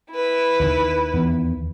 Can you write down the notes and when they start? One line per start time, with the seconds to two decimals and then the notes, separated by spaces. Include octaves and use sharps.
0.12 E4 B4
0.60 D#2 D#3
1.14 E2